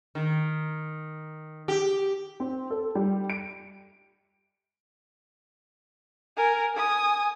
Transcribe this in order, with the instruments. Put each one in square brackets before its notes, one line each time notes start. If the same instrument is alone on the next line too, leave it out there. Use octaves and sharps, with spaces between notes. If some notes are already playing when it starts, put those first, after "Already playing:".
[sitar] D#3
G4
[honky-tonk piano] C4
A4
G3
D7
[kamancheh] A#4 G#5
G#5 D#6